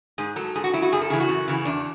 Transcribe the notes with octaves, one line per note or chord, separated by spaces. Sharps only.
G#2 G#4
F#3 A4
G#2 G#4
F#4
F#3 E4
F#4
F#2 G#4
A4
C#3 E3 G#4
F#4
F#2
C#3 E3
E2 D4